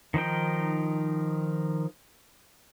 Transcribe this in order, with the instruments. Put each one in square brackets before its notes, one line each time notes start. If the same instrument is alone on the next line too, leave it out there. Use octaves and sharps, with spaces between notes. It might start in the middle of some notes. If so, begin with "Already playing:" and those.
[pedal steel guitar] D#3 F3 D#4 G5